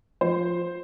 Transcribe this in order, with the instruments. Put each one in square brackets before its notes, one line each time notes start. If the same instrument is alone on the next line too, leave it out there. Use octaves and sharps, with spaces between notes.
[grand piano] F3 [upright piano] C5